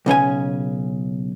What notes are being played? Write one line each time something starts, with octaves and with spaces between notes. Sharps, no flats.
B1 C#3 C#4 G#5